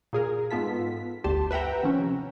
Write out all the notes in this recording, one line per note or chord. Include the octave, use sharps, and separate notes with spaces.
A#2 G#4 A#4
G#2 B3 F4 A4 B6
G1 D2 G4 A5 C6
B4 E5 F#5 G5 A#5
C3 D#3 F3 C#4